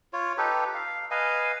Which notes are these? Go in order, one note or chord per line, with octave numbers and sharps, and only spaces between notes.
F4 C#5
D#4 G4 A4 B4
F5
B4 D#5 F5 G#5